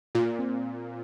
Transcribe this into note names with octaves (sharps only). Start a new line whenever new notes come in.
A#2 F4
C4